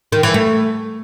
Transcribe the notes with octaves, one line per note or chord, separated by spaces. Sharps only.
D#3
E3
A3